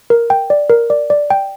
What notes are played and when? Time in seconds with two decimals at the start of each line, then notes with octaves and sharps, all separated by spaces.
0.10 A#4
0.30 G5
0.50 D5
0.70 A#4
0.90 D5
1.10 D5
1.30 G5